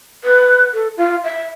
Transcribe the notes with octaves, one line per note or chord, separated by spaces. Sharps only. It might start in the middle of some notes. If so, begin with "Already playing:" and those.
B4
A4
F4
E5